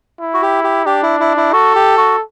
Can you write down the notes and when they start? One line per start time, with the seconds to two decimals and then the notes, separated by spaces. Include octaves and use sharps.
0.19 E4
0.34 F#4
0.42 G4
0.64 G4
0.86 D4 G4
1.03 E4
1.20 E4
1.37 E4
1.53 F#4 A4
1.76 G4
1.98 F#4